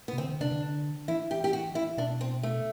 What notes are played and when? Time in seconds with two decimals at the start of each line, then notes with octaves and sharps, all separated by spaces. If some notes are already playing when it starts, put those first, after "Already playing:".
0.08 B3
0.13 C3
0.18 D3 C4
0.29 D3
0.40 C3 D4
0.51 D3
1.08 E3 E4
1.31 G4
1.44 G4
1.53 F#4
1.75 E4
1.98 B2 D4
2.21 C4
2.43 A3